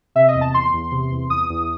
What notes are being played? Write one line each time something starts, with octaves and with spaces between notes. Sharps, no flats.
C3 E5
D#5
E2
A5
E2 C6
E2
C3
E2
E2 D#6
E2